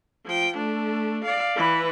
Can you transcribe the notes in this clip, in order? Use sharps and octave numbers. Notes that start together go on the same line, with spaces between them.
F3 G5
A3 D4
D5 F5
E3 B4